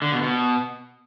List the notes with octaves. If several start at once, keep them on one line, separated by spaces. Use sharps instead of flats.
D3
B2
B2